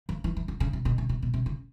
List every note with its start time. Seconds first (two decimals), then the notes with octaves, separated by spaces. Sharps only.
0.09 F3
0.24 E3
0.37 E3
0.48 D3
0.60 C#3
0.73 C3
0.85 B2
0.98 C3
1.09 C3
1.22 B2
1.34 C3
1.46 C#3